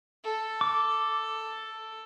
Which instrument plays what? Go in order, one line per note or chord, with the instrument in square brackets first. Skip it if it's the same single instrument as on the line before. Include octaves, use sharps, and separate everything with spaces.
[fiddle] A4
[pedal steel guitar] D6